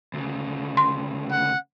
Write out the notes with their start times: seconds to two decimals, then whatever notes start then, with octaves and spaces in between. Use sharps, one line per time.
0.14 D2 C#3
0.77 C6
1.31 F#5